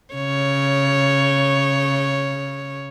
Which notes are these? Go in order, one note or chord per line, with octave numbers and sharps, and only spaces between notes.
C#3 C#5